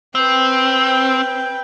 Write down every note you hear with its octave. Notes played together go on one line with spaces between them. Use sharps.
C4 B4 G5